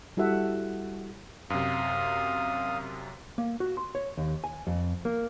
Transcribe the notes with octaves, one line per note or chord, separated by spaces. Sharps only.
G3 E4 F#4 A4 E5 F#5
F#2 C3 F5 D#6
A#3
F#4
C6
C#5
D#2
G#5
F2
A#3